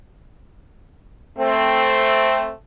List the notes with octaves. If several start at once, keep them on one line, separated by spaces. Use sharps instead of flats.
A3 C4